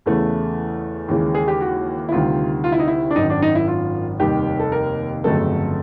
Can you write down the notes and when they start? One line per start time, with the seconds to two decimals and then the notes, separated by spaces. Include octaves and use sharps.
0.06 E2 C#3 E3 A3
1.08 D#2 C#3 E3 G#3
1.35 G#4
1.48 G4
1.61 F#4
2.09 E4
2.12 D2 C3 D#3 G3 F4
2.64 F4
2.72 E4
2.79 D#4
2.88 E4
3.11 D4
3.16 G#1 F#2 D#3 D#4
3.30 D4
3.42 D#4
3.55 E4
3.67 F4
4.20 F1 D#2 D#3 G3 G4
4.59 A4
4.72 A#4
5.24 G1 F2 C#3 F#3 A3 A4